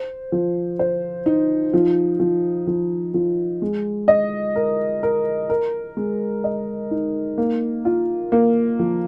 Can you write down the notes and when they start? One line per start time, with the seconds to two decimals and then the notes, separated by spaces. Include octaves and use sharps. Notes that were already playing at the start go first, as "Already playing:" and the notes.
Already playing: C5
0.32 F3
0.79 C5
1.26 D#4
1.74 F3
2.20 F3
2.67 F3
3.14 F3
3.62 G#3
4.08 D#5
4.56 A#4
5.03 A#4
5.50 A#4
5.97 G#3
6.44 D#5
6.91 D#4
7.38 A#3
7.85 F4
8.32 A#3
8.79 F3